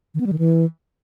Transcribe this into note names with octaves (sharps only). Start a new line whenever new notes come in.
D#3
B3
G3
D#3
E3